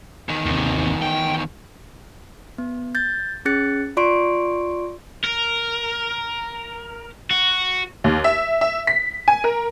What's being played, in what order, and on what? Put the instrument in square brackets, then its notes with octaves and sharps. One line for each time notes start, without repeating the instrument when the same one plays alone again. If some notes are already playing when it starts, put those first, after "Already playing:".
[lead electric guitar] E2 D#3
[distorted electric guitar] D#2 C3
G5
[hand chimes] B3
G6 A6
C#4 G#4 F#6 A6 C#7
F4 D5 C6 C#6 D7
[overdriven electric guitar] A#4
F#4
[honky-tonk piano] D#2
E5
E5
B6
G#5
A#4